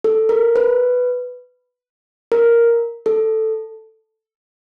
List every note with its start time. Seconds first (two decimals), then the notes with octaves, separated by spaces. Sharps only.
0.04 A4
0.29 A#4
0.56 B4
2.32 A#4
3.06 A4